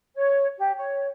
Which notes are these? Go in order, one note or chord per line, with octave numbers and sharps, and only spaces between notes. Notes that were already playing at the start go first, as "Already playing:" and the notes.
C#5
G4
C#5